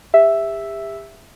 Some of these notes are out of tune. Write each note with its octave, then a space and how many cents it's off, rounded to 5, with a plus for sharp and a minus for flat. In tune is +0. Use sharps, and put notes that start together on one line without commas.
G4 +40 E5 +0